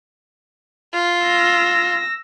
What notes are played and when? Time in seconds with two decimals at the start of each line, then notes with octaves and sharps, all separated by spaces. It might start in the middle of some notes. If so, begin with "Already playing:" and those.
0.94 F4
1.27 E6 A#6